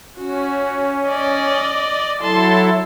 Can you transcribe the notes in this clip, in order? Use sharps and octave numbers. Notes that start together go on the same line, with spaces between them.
C#4 F#4
D5 D#5
F#3 E4 A4 A5 C6